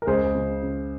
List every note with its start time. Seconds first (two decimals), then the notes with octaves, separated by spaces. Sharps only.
0.02 A#4
0.07 C#2 G#4 C5
0.35 C#3
0.63 C#3